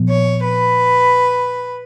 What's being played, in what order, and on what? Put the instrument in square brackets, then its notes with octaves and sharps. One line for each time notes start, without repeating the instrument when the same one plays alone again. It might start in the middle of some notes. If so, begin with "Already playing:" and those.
Already playing: [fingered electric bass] A#2 F3 B3
[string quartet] C#5
B4